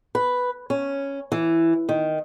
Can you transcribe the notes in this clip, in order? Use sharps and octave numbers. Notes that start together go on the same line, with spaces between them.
B4
C#4
E3
D#3